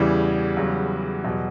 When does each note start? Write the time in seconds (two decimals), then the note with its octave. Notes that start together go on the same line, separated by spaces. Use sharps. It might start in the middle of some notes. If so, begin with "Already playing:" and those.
Already playing: E2 C#3 E3 G3
0.57 E2 C#3 F#3
1.24 E2 B2 F#3